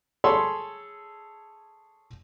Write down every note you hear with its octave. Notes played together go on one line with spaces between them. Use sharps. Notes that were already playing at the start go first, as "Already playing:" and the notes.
G#4 A4 C#5 B5 C6